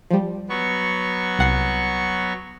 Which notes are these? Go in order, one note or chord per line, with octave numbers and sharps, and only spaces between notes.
F3 G3
F#3 B3 C#6
C2 F#5 C7